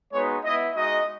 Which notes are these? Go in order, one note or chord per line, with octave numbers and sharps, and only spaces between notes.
G#3 B3 D#4 F#4 C#5
B3 E4 D#5
G#3 D#4 F#4 D#5